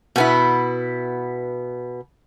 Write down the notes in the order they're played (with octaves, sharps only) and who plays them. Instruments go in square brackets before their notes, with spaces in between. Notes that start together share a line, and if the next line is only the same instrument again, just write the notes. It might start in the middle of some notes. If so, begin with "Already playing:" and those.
[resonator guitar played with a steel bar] B2 B3 E4